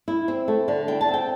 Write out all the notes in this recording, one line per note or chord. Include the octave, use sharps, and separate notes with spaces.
E4
C4
A3
D3
E4 G5
A5
C4 G5